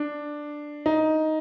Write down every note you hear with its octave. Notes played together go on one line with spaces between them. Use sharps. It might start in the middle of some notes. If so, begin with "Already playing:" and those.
Already playing: D4
D#4